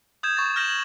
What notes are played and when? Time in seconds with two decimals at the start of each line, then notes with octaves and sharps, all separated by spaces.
0.23 D#6 G6 G#6 E7
0.37 C#6 A6
0.56 F6 G6 A#6 E7 F#7
0.68 G#6 F#7